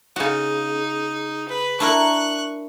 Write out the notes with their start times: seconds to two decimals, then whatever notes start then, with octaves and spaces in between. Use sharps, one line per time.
0.16 C#3 D#4 F#4
1.48 B4
1.80 D4 E4 A#4 C#6 F#6